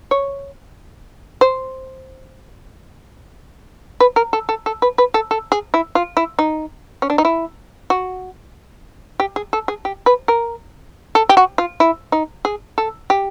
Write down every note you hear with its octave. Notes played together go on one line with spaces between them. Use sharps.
C#5
C5
B4
A#4
A4
A4
A4
B4
B4
A4
A4
G#4
E4
F4
E4
D#4
C#4
D4
D#4
E4
F#4
G4
G#4
A4
G#4
G4
B4
A#4
A4
G4
F#4
F4
E4
D#4
G#4
A4
G4